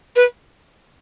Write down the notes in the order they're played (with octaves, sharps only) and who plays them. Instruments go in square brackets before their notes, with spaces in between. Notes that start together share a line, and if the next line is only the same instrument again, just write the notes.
[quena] B4